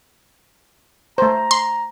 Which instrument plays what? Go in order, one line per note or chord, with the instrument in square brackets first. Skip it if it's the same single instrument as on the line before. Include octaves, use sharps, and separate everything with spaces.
[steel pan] A3 C5 [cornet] A#5
[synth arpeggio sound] C6